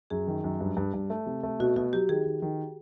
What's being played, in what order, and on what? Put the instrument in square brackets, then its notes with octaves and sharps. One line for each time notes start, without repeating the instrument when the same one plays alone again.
[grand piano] F#2 [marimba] G#4
[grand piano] D#3
F#2
G2
G2
G2
A3
C3
A3
[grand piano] B2 [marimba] F#4
[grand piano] B2 [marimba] F#4
[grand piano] F#3 [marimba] G4
[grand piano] D#3 [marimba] G#4
[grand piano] D#3
D#3